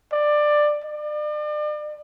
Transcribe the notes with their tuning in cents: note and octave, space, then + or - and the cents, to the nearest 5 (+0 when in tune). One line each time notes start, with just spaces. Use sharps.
D5 +15
D5 +40